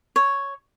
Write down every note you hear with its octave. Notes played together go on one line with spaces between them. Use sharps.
C#5